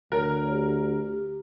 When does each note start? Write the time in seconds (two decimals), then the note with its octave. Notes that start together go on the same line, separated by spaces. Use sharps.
0.12 D2 A#4 C#5
0.51 G4